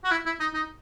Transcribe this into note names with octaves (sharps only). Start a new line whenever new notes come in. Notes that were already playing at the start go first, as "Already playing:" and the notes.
F#4
E4
E4
D#4
D#4